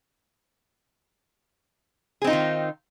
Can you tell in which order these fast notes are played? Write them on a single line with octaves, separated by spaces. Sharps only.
G#4 C4 D#4 F4 D#3